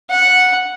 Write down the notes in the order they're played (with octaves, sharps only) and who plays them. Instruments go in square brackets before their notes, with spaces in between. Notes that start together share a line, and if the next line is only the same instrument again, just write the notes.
[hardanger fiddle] F#5